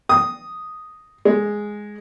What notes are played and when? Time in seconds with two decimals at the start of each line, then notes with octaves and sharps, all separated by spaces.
0.09 D#6
1.25 G#3